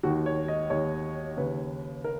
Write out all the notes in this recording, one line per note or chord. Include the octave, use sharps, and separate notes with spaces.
D#2 D#3 F#4
C#5
D#5
D#2 D#3 C#5
D#2 C#3 B4
A#4